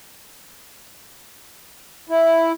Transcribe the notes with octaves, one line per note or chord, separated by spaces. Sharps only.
E4